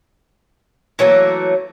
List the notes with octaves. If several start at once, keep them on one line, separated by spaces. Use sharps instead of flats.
E3 F#3 A3 A#3